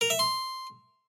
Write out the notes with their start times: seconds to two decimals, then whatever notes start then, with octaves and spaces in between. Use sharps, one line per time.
0.01 A#4
0.10 E5
0.19 C6